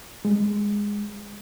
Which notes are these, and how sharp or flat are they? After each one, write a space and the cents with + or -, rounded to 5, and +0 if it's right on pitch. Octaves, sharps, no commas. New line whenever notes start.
G#3 -10